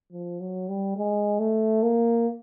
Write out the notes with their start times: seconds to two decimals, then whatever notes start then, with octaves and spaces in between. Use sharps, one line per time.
0.12 F3
0.40 F#3
0.69 G3
0.97 G#3
1.39 A3
1.83 A#3